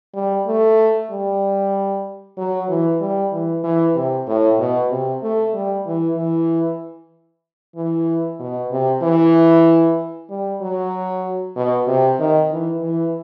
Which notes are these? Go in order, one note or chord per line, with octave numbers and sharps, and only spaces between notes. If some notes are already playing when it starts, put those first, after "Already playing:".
G3
A3
G3
F#3
E3
G3
E3
E3
C3
A2
B2
C3
A3
G3
E3
E3
E3
B2
C3
E3
G3
F#3
B2
C3
D#3
E3
E3